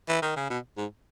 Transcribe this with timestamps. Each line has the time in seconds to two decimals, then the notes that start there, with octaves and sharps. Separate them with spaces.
0.09 E3
0.22 D#3
0.36 C#3
0.50 B2
0.77 G#2